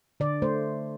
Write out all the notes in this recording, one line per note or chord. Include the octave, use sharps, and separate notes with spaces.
D3 D5
A3 C5